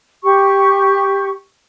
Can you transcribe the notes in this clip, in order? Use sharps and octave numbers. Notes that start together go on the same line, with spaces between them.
G4 C#6